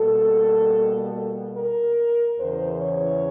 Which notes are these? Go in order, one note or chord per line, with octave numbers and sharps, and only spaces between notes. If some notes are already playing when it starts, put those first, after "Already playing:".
Already playing: B2 G3 A#3 A4
A#4
E2 C#3 E3 C5
C#5